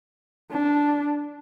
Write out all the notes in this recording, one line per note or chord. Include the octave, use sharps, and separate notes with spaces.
D4